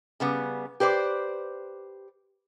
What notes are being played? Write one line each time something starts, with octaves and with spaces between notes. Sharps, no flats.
C#3 G3 B3
G4 B4 C5 D5